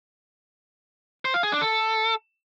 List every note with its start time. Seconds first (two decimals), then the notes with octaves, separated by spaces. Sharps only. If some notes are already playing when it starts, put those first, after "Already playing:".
1.25 C5
1.34 F5
1.43 G#4
1.52 D4
1.61 A4